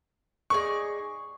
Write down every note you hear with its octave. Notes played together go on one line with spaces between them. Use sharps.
D#4 G#4 B4 D5 C#6